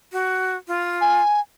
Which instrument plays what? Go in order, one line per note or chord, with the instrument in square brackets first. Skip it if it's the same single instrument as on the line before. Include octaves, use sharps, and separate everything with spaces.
[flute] F#4
F4
[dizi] G#5